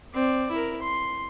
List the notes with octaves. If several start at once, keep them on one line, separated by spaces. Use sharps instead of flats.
C4 D5
E4 A#4
C6